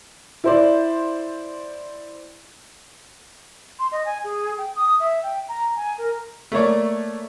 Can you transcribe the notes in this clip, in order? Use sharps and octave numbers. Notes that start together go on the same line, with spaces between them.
E4 C5 D5
C6
D#5
G#5
G#4
G5
D#6
E5
G5
A#5
G#5
A#4
A3 A#3 C#5 D5